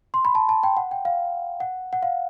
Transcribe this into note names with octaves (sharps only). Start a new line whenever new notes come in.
C6
B5
A5
A5
G5
F#5
G5
F5
F#5
F#5
F5